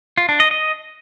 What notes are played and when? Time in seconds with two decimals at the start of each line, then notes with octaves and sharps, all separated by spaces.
0.18 F4
0.29 D4
0.40 D#5
0.51 D#5